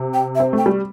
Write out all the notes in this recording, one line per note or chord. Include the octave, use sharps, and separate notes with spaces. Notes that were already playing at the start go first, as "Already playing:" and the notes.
Already playing: C3
G5
E5
C4
A3
G5
G3